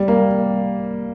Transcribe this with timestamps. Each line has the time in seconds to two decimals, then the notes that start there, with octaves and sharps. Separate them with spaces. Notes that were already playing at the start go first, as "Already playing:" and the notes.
Already playing: G3
0.08 A#3